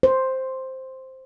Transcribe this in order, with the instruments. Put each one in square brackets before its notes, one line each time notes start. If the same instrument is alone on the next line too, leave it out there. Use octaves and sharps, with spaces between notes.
[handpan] C5